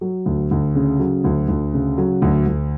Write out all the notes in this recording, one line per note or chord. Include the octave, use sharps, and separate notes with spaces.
F#3
D2
D2
C#3
F#3
D2
D2
C#3
F#3
D2
D2